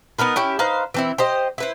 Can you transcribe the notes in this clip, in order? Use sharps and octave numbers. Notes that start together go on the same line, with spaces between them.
B3 D#4 A#4 B4
C#4 E4 G4
D#4 B4 C5 F5
E3 C4 E4
G4 C5 D#5
E4 B4 C5